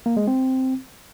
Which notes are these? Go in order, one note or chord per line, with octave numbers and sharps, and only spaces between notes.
A#3
G#3
C4